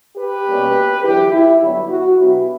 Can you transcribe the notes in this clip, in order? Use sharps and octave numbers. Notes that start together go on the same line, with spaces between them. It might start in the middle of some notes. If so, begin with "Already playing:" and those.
G4 B4
B2 G3 A#3 C#4
E2 D3 F#3 E4 G4
E4
G2 D3 F#3 B3 E4
F#4
B2 F#3 B3 D4 E4 G4